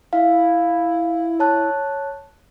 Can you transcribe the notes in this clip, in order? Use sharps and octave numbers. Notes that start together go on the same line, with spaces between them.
E4 F5
C#5 A5 F#6